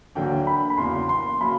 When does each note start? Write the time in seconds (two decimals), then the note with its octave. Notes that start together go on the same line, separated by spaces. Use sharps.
0.15 D2 D3 F#3 A#3 D4 G5
0.47 B5
0.70 B5
0.78 E2 C#3 F#3 A#3 C6
1.09 C6
1.41 C#3 F#3 A#3 B5